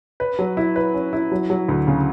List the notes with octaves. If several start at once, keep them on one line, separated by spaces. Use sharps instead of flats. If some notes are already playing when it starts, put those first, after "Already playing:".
B4
F#3
E4
B4
C#4
E4
F#3
F#3
D2
C#3